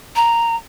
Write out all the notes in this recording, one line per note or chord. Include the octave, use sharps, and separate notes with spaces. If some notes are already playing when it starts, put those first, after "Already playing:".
A#5